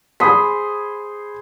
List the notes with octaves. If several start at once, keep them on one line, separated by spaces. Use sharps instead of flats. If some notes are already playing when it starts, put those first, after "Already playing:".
G#4 C5 B5 D#6 B6